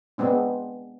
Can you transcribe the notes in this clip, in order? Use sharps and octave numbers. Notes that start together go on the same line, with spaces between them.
G#3 B3 C4 D4